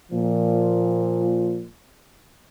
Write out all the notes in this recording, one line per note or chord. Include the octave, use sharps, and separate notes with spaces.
A#2 F3